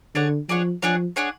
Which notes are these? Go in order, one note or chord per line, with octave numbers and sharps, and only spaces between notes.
D3 D4 G#4 C#5 F#5
F3 D4 G#4 C#5 F#5
F3 D4 G#4 C#5 F#5
D4 G#4 C#5 F#5